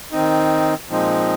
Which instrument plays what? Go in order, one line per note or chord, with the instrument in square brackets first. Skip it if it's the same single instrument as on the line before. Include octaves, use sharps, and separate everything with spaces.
[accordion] D#3 C4 D#4
A#2 F3 G#3 C4 D#4